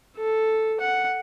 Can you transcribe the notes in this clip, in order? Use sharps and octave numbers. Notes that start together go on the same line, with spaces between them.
A4
F#5